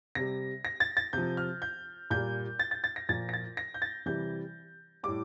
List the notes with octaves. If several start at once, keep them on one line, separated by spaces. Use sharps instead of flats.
C3 G3 A#6
A#6
A6
A6
C3 F3 G6
F6
G6
A#2 G3 G6
A6
A6
A6
A#6
A#2 F3 A6
A#6
A6
A#6
G6
A6
C3 E3 G3 G6
A2 G3 D6